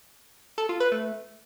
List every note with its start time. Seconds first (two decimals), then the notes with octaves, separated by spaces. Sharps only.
0.58 A4
0.69 F4
0.80 B4
0.92 A3